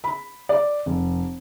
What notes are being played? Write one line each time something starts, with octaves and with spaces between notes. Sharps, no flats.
B5
D5
F1